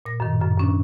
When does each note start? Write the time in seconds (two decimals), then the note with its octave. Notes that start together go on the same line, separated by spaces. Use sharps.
0.06 A#2 A#6
0.20 F#2 A2 D#3
0.40 F#2 F6
0.58 F#2 C#4 D4